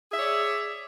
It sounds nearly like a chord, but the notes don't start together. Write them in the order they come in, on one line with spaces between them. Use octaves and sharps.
G#4 E5 C#5 D5